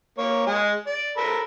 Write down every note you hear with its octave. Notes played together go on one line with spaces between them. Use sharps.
A#3 C#5
G#3 G#4
D5
A4 A#4 B5